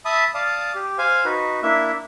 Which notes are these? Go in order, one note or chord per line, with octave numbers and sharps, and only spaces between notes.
E5 A5 B5 D#6
D5 F5 A5 D#6
G4
C5 F5 G#5
D#4 F#4 B4
A#3 D4 E4 E5